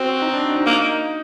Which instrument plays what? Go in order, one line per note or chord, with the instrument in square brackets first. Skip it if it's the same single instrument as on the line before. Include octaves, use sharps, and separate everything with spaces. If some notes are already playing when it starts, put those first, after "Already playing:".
Already playing: [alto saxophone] C4 [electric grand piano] F#4
[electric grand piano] D#4
D4
D4
D#4
[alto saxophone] A#3 [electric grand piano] D#4